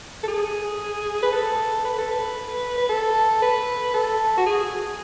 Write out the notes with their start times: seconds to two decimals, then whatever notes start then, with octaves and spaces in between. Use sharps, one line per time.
0.23 A4
0.28 G#4
1.22 B4
1.32 A4
1.85 B4
1.98 A4
2.11 B4
2.78 B4
2.89 A4
3.42 B4
3.94 A4
4.37 F#4
4.46 G#4